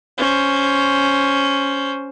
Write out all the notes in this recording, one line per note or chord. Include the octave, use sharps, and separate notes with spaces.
C#4 C5